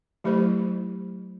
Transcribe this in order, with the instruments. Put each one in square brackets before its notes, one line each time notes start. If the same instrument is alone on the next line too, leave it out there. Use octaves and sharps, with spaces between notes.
[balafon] F#3 A3 E4 G4 C5